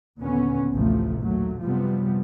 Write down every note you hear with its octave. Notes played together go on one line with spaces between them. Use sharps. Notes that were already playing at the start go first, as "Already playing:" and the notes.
D#2 A#2 D3 B3 C#4
A1 D2 A2 C3 F3 A3
D#2 A#2 F#3 A3
F#2 C3 F3 G3 B3